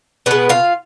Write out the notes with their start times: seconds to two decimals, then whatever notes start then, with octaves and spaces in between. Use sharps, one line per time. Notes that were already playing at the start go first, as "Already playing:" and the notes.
0.26 B2 G#3 B3 B4
0.49 F4 F5